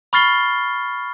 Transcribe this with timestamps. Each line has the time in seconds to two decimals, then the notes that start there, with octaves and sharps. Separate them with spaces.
0.13 B5 C#6 F6 A6 C7 G7